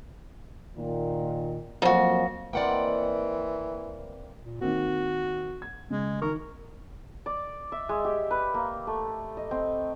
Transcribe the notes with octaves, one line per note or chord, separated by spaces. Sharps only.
A#2 D#3
F2 F#3 A#3 D#4 F#4
E3 A#3 C4 D5 D#5 F#5 G5
A#2
D#3 A#3 C4 F#4
G#6
C#3 G#3
D#3 A#4 C#6
D5
E5
G#3
G4
B4
A#3
A3
D#5
C4